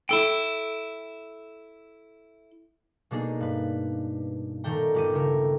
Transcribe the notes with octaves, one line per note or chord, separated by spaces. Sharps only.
E4 A4 G5
B2 G#3 A#3 D4 D#4 G#4
G2 B4
A#2 D#3 A3 D4 G5 A#5
G1 G4 D6 D#7
C#3 A3 A#4